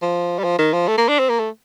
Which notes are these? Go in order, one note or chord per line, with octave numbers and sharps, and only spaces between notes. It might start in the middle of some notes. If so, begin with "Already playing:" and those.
F3
G3
F3
D#3
F3
A3
A#3
D4
C4
A#3
A3